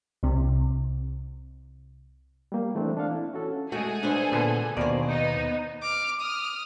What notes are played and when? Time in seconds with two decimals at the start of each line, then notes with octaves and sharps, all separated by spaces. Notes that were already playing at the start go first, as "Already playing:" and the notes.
0.23 C2 C3
2.52 G3 A#3
2.75 E3 A3 C4 D4
2.97 D4 A4 F5
3.11 E4
3.33 C#4 F#4 A4
3.72 G#3 A3 F#4 G#4 A4 G#5
4.03 D4 B4 C5
4.32 A#2 D3 B3
4.77 D#2 B2 A#4 C5 D5
5.09 B3 D#4
5.83 D6 F6
6.20 D#6 F6